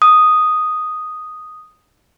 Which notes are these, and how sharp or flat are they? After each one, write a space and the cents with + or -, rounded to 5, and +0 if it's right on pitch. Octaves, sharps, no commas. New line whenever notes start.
D#6 -5